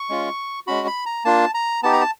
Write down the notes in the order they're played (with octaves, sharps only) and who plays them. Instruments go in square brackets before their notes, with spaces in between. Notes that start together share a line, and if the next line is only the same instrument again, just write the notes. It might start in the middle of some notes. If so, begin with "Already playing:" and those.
Already playing: [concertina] C#6
G#3 C#4 F4
G#3 C#4 F#4 B5
B5
A#5
A#3 D4 F4 A5
A#5
B3 D#4 G4 A5
A#5
A5